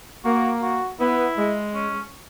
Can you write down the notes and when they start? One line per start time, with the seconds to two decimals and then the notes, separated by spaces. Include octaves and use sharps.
0.25 A#3 F#4
0.62 F#4
1.00 B3 E4
1.38 G#3
1.75 C#4